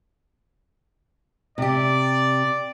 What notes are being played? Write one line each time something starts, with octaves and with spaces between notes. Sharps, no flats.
C3 G4 D5